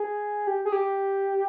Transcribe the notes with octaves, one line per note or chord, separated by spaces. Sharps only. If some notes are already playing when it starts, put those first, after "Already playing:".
Already playing: G#4
G4
G#4
G4